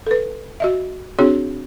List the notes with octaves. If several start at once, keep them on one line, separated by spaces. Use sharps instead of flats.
A4 B4
F#4 D#5 E5
C4 D4 F#4 G#4 C#5